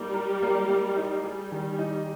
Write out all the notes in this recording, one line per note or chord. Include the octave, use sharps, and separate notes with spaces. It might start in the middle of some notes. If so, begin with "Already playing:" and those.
Already playing: G3 A#3 D#4
A#4
A#3
A#3
D#4
G3 G#4
D#3
D#4